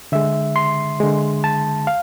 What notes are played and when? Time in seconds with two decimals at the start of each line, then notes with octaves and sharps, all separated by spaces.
0.12 D3 G#3 E5
0.56 C6
1.00 D3 G#3
1.44 A5
1.87 F5